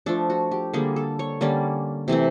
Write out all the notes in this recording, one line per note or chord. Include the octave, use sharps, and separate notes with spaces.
F3 A3 D4 A4
F#4
G4
D3 G3 A#3 G#4
A4
C#5
D3 G3 A#3 C#4 D5
C3 E3 A3 C4